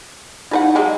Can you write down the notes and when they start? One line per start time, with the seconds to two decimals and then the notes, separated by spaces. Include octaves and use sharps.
0.51 G3 D#4 E4 B4 F#5
0.75 F#3 G#3 G4 G#4 A#5